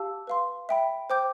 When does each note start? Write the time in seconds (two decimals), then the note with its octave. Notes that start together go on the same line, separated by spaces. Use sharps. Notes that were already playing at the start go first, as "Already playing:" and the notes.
Already playing: G4 F5 A5 E6
0.27 B4 F5 C6
0.69 E5 G5 B5
1.10 C5 G5 D6 G6